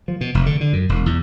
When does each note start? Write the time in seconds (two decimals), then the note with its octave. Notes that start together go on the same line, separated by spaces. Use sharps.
0.08 F3
0.21 B2
0.35 F1
0.46 D3
0.61 D3
0.73 F#2
0.89 E1
1.06 E2